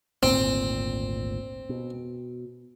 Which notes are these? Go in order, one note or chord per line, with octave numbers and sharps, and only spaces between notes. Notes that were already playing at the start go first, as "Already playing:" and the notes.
G#1 D2 A#2 C4
B2